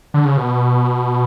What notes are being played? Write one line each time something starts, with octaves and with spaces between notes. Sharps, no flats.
D3
C#3
B2